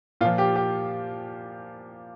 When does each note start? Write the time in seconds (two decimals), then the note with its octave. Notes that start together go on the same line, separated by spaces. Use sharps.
0.21 A#2 F4
0.25 F3
0.38 G4
0.56 G4